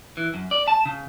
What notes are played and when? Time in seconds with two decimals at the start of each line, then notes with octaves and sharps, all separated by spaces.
0.17 E3
0.34 F#2
0.51 D5
0.68 A5
0.86 C#3